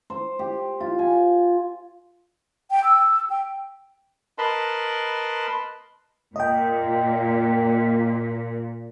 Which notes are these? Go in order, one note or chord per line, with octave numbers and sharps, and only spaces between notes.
C5
G4
F4
G#5
G5
E6
G5
A#4 B4 D#5 A5 B5 C6
A#2 D#5 G5